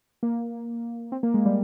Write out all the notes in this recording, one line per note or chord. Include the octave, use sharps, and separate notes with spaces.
A#3
C4
A#3
G#3
G3